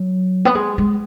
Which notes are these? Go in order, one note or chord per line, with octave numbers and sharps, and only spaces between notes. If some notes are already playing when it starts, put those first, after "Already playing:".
Already playing: F#3
B3
G#3
G#3